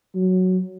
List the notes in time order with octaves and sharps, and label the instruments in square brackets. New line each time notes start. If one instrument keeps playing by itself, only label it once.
[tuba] F#3